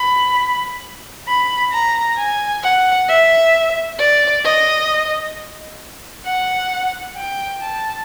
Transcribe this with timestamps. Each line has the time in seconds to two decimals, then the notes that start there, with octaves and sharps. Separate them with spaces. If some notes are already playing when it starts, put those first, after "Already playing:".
Already playing: B5
1.28 B5
1.72 A#5
2.18 G#5
2.63 F#5
3.08 E5
3.98 D5
4.45 D#5
6.26 F#5
7.17 G5
7.61 A5